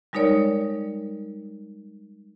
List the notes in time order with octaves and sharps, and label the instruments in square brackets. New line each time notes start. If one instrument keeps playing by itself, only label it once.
[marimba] G3 G#3 D#4 A#4 C#5 D5